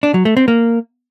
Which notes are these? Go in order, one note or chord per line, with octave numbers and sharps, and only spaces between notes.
D4
F#3
A3
C4
A#3